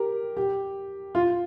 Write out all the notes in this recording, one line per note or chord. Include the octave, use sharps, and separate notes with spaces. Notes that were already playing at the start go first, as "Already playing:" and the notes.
Already playing: G4 A#4
G4
F4